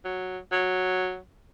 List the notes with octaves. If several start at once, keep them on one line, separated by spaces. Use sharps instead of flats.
F#3
F#3